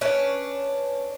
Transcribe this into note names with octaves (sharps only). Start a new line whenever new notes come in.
C#4 D4 B4 C#5